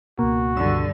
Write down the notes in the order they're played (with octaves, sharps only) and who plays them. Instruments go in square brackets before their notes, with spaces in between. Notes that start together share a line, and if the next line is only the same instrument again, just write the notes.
[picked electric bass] C#2 B2 [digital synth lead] A#3 [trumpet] F#4
[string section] G2 D3 [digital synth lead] E6